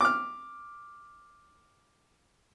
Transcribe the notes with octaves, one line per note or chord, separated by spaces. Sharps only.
D6 F6